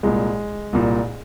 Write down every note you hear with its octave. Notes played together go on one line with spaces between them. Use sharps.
C2 A#2 G#3
C2 A#2